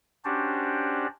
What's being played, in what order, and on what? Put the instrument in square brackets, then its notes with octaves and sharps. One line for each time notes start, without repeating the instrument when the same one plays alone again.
[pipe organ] C#4 D4 F#4 G4 C5 D5